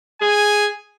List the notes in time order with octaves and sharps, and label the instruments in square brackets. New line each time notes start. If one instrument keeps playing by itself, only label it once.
[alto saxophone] G#4 [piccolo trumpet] G#5